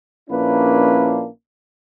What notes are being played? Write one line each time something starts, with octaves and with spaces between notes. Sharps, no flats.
A#1 A#3 C#4 D4 E4 B4